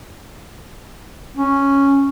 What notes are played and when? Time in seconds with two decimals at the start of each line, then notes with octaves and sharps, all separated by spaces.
1.37 C#4